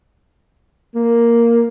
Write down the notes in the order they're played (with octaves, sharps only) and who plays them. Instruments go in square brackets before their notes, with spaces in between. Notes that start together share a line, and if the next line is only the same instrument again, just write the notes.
[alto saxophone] A#3